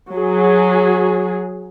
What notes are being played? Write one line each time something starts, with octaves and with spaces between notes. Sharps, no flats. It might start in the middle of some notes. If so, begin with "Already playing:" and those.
F#3 G#4